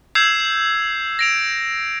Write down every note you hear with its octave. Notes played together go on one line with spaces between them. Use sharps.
E6 G6 G#6 C7 E7 F7
A#6 D7 F7